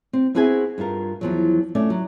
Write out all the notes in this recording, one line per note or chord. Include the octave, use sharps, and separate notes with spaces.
C4
B3 C4 E4 F#4 G#4 G#5
G2 G3 F4 A#4
E2 F3 F#3
A3 C#4 D5
F#3